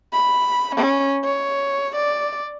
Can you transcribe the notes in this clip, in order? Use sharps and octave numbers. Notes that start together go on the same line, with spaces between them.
B5
C#4
C#5
D5